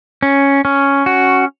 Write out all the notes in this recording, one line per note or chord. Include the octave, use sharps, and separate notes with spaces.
C#4
C#4
F#4